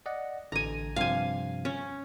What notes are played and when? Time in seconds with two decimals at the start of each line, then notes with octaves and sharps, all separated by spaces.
0.06 D5 D#5 F#5
0.52 A1 D3 G#5 A#5
0.96 G2 C3 F3 F5 G#5
1.65 C#4